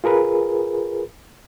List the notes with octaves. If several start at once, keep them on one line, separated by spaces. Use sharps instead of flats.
F4 G#4 A#4 B4